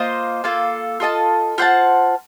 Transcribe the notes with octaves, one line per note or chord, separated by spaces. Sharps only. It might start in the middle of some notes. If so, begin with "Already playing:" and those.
Already playing: A#3 F4 C5 D#5
A#3 F4 A4
F4 A4 D#5 A5
F4 C5 F#5 A5